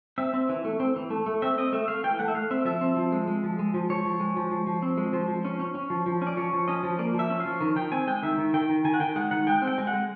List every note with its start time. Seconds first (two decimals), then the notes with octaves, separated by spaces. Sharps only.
0.18 C4 E5
0.34 C4
0.49 E3
0.65 A3
0.80 C4
0.96 E3
1.10 A3
1.26 A3
1.42 C4 E5
1.58 C4 D#5
1.73 A3 E5
1.88 A3 F5
2.04 E3 G5
2.19 A3 F#5
2.28 E5
2.34 A3 F5
2.51 C4 E5
2.65 F3 E5
2.81 C4
2.97 F3
3.12 G#3
3.27 G#3
3.44 F3
3.59 G#3
3.74 F3
3.89 F3 C#5
4.05 F3
4.20 G#3
4.36 F3
4.51 F3
4.67 F3
4.82 C4
4.97 G#3
5.13 F3 C5
5.28 F3
5.44 C#4
5.60 C#4
5.75 C#4
5.90 F3
6.06 F3
6.22 C#4
6.27 D5
6.37 F3 C#5
6.53 F3
6.68 C#4 D#5
6.83 F3
6.99 A#3 D5
7.14 F3 E5
7.30 C#4
7.40 F5
7.46 F3
7.60 D#3
7.76 D#3 G5
7.92 C4 G#5
8.07 G#3 G5
8.23 D#3 E5
8.38 D#3
8.54 D#3 G5
8.69 D#3
8.85 D#3 G#5
8.94 F#5
9.00 D#3 G5
9.16 G#3 F#5
9.31 D#3 F#5
9.47 G#3 G5
9.62 C4
9.67 G5
9.78 G#3
9.87 F#5
9.93 G#3